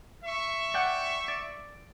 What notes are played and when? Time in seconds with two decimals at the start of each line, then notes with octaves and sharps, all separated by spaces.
0.24 E5 C#6
0.74 D5 F#5 G5
1.28 D5